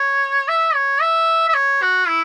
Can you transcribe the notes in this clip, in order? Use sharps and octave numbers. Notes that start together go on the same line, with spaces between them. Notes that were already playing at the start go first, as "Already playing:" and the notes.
Already playing: C#5
E5
C#5
E5
E5
C#5
F#4
E4